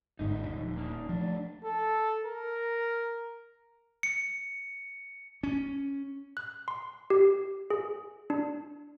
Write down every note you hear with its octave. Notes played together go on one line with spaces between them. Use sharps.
G1 G#2 D3 D#4
D#1
F2 G#2
A#3 D4 D#4
F3 A3 D4
A4
A#4
C#7
C#4
F#6
C6
G4
G#4
D4